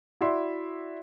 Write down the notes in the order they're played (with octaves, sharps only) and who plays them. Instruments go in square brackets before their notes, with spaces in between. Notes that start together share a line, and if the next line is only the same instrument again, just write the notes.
[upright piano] E4 F#4 D5 E5 C6